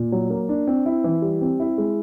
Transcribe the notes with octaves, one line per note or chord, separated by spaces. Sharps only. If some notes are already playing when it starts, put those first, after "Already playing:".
Already playing: A#2
F#3
A#3
D4
C4
E4
E3
G3
C4
E4
G#3